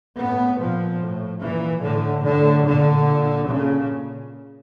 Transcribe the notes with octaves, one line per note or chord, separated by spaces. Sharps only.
A2 B3
A#2 F3
A2
A#2 E3
A2 D3
A2 D3
A#2 D3
A#2
A#2 C#3